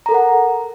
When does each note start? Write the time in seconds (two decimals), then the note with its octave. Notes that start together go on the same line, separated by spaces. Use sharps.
0.06 A#5
0.09 A4
0.12 A#4
0.14 F#5